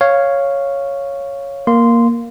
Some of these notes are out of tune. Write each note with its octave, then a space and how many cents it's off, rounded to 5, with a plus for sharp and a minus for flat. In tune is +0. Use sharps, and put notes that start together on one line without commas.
C#5 +0 F5 -5
A#3 +0 C6 -10